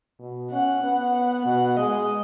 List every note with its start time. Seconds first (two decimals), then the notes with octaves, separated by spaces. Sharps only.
0.19 B2
0.51 C#4 F#5
0.83 B3
1.15 F#5
1.45 B2 F#5
1.77 G#3 D#5